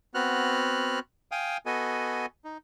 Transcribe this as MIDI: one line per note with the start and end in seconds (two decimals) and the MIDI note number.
0.14 0.99 59
0.14 0.99 60
0.14 0.99 66
0.14 0.99 89
0.14 0.99 90
1.32 1.57 77
1.32 1.57 79
1.32 1.57 80
1.32 1.57 87
1.66 2.26 59
1.66 2.26 66
1.66 2.26 69
1.66 2.26 75
1.66 2.26 80
2.45 2.58 63